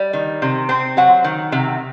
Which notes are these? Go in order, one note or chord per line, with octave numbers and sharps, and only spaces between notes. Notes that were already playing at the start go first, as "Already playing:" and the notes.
Already playing: G3
D#3
C3
C4
F#3 F#5
D#3
C3